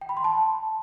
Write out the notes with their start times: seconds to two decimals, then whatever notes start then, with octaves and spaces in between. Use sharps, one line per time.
0.01 G5
0.09 B5
0.17 C6
0.24 A5